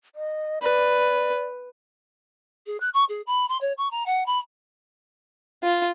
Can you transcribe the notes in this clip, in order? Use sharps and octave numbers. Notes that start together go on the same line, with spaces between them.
D#5
B4 D5
G#4
F#6
C#6
G#4
B5
C6
C#5
C#6
A#5
F#5
B5
F4